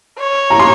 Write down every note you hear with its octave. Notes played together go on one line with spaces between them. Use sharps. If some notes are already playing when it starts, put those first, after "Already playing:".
C#5
A#5
C6